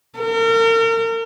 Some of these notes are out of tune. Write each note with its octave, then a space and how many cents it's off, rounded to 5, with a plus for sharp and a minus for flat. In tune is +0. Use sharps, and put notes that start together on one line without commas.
A#4 -40